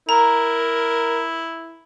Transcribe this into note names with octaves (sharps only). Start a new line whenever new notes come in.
E4 A#4 A#5